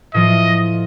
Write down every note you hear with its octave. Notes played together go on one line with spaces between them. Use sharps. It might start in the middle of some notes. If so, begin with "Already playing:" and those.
A2 F3 F4 D#5